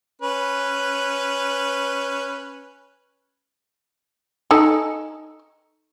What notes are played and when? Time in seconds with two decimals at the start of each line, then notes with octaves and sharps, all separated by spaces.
0.22 C#4 B4
4.51 D#4 A4 G#5